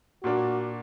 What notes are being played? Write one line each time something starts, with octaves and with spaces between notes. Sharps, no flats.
A#2 A#3 D4 F#4